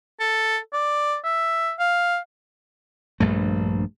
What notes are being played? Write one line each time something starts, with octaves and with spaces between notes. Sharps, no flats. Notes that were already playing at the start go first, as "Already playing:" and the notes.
A4
D5
E5
F5
A#1 G2 A3